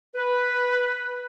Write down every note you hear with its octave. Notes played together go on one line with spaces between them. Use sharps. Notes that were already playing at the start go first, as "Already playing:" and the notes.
B4